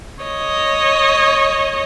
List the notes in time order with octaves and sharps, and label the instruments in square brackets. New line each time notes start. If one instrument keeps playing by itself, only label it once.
[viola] C#5 D#5